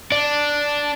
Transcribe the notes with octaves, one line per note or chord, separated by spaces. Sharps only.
D4